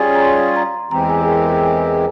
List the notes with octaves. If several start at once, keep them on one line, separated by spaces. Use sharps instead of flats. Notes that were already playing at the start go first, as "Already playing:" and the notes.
Already playing: G3 C#4 F4 G#4
A#5
C6
A#5
E2 E3 G#3 C4 G4 A#5
G#5
G#4
A#4